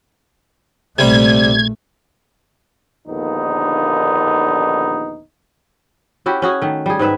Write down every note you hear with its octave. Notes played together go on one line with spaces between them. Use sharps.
A#1 C3 G3 A3 G#6
A#1 D#2 D3 B3 D#4
C#4 E4 F#4 G4
C#4 F#4 G#4
D#3 A3
G3 G#4
G#2 D#3 B4 E5